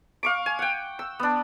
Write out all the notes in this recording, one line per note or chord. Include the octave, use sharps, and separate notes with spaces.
F5 C#6 D6
G#5
F#5 G5
E6
B3 D4